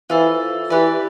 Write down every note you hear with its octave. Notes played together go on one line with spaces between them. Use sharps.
E3 F4 A4 C5
E3 G4 B4 D5